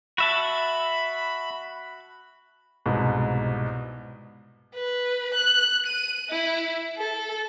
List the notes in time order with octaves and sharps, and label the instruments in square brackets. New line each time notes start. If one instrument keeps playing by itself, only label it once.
[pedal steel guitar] F#4 E5 A5 [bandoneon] B5
[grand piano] C2 G#2 B2
[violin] B4
F#6
D#7
E4
A4